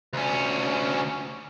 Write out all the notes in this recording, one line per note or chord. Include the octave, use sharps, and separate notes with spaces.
D2 C#4